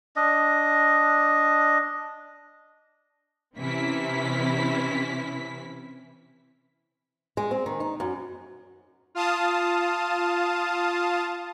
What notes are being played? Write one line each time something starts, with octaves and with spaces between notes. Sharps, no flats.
D4 D#5
C3 E3 C4 C#4 E4 B6
G#3
C4
D#3
D#4
F#2
F4 F5 A5 D#6